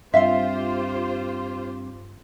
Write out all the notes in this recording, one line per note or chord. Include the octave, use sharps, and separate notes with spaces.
G2 C4 F4 G4 C5 E5 F5 C6